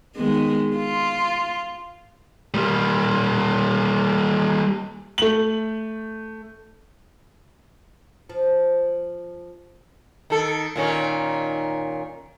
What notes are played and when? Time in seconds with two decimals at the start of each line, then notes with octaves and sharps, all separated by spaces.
0.16 D#3 G#3 B3
0.77 F4
2.54 G3 A#3
5.18 A3 F#7
8.29 F3
10.30 D#3 A4
10.76 A#2 D#3 C#4